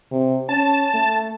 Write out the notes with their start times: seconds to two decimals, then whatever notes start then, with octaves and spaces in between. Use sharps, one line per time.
0.11 C3
0.49 C#4 A5
0.94 A3